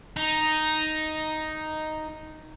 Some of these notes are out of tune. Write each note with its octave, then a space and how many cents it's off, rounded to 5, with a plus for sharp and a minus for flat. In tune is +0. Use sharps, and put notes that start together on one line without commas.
D#4 +0 A#5 +0